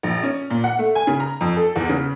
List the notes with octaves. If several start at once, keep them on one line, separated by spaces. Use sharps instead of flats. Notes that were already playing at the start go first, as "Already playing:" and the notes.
A#1
C#4
A#2
F#5
A3
G#5
C#3
A#5
F2
A4
E2
C#3